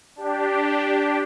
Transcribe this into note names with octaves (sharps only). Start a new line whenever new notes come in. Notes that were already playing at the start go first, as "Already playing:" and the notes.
D4 G4